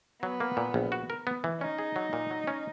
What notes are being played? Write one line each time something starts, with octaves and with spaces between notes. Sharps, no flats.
F#3 B3
A#3
A#2
A#1
F#4
A#4
B3
E3
C#4 D#4
G#4
F#3
A#2
F#3
C#4